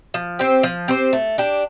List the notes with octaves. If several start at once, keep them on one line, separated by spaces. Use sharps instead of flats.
F3
C4 G4 C5
F3
C4 G4 C5
A3
D4 G4